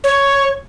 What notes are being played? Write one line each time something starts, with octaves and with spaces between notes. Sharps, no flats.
C#5